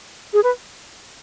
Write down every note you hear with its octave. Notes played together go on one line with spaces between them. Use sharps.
G#4
B4